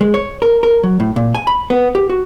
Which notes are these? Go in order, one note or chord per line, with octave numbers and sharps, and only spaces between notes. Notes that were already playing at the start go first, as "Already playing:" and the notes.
G#3
C#5
A#4
A#4
F#3
A2
A#2
G#5
B5
B3
G4
F#4